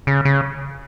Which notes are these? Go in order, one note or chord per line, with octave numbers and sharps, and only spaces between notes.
C#3
C#3